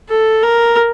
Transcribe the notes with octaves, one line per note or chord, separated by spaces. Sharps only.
A4
A#4